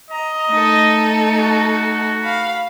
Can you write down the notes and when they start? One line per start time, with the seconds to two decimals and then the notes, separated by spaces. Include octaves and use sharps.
0.10 D#5 A#5
0.50 A3 D#4 A4
1.39 F#4
2.23 F5 B5